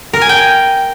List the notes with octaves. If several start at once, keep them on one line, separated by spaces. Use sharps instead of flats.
A#4
G#5
G5